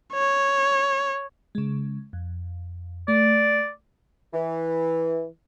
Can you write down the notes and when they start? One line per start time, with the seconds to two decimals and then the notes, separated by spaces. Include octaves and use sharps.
0.14 C#5
1.55 C#3 G#3
2.13 F2
3.08 A3 D5
4.34 E3